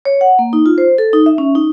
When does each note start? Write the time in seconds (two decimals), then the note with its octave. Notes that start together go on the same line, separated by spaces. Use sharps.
0.05 C#5
0.21 F#5
0.39 A#3
0.53 D#4
0.66 F4
0.78 C5
0.98 A4
1.13 D#4
1.26 E5
1.38 C#4
1.55 D#4